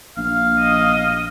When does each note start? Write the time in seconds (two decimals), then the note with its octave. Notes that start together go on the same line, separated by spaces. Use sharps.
0.17 A#1 F5
0.59 D#5